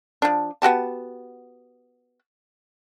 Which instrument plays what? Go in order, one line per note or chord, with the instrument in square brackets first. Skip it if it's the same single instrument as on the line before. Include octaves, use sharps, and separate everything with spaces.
[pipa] F3 D4
B3 F#4 G4 A5